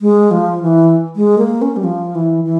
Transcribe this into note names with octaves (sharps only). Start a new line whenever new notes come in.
G#3
F3
E3
G#3
A#3
C#4
G3
F3
E3
E3